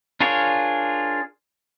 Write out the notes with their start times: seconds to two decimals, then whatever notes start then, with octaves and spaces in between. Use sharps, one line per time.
0.20 D4 F4 G#4 A#4 C#5